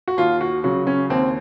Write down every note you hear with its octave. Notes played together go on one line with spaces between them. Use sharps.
F#4
D#2 F4
F#4
C#3 F#3 F#4
C#4
D#2 C4